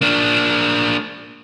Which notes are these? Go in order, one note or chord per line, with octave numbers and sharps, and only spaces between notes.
A#3 D4